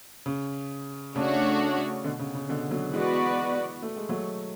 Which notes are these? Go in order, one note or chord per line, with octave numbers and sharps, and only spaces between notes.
C#3
C#3 A3 D4 F#4 C#5
B2 D3
C#3
C#3
B2 D3
D3 F#3
E3 G#3 B3 F#4 B4 D5
A3
G#3
F#3 A3